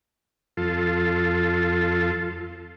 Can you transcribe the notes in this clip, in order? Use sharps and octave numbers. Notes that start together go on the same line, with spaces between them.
F2 F4 A4